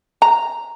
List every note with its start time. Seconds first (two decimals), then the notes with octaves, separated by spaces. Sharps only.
0.22 A#5